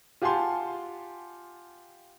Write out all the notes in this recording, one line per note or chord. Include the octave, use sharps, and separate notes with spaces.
F4 G4 F#5 G#5 A5 C6